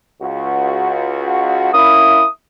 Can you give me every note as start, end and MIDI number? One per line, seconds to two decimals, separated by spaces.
0.21 1.70 37
0.21 1.70 66
1.74 2.22 58
1.74 2.22 61
1.74 2.22 64
1.74 2.27 87